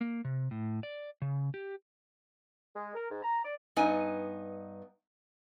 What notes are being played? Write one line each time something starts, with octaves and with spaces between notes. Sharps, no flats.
A#3
C3
A2
D5
C#3
G4
G#3
A#4
G#2
A#5
D5
G2 B3 D#4 D#5 G#5